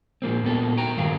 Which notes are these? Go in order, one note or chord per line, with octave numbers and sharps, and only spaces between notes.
A#2 F3 A#3 C4
A#2 B3 A4
F#4 G5 A#5
G2 D#3 F#3 F5